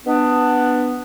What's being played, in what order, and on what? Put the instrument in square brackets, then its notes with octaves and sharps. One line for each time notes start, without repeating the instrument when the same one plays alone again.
[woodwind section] B3 D4